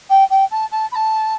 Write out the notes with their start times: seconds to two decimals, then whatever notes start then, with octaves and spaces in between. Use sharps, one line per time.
0.09 G5
0.30 G5
0.50 A5
0.71 A5
0.91 B5
0.94 A5